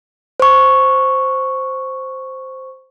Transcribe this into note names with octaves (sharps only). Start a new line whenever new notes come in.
C5 C#6